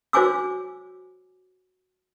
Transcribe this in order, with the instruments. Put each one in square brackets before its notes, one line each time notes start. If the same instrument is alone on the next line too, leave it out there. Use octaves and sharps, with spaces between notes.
[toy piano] F#4 C5 C#5 G#5 D6 E6